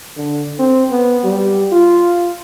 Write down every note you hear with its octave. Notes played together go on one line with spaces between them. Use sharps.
D3
C4
B3
G3
F4